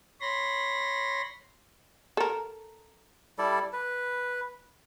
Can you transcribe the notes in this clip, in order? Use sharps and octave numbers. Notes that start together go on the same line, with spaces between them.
C#5 B5 C6 A#6
A4 A#4
G3 E4 A4 D5
B4